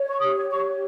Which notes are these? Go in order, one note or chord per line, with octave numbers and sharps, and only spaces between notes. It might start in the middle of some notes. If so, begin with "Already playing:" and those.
Already playing: C#5
C#6
G4 D#6
C#5 C#6